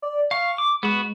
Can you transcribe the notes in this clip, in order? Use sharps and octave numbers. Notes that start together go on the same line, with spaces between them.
D5
F5 C#6
D6
G#3 B3 F#4